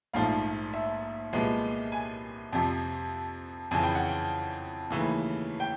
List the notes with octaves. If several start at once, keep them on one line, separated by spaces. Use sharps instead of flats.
A#1 G#2 F3 A3 F5
E5
C2 A#2 F3 G#3 B3
G#5
F2 C3 F3
F2 C#3 E3 G#5
G5
F#5
G5
D#2 C#3 E3 A3
G5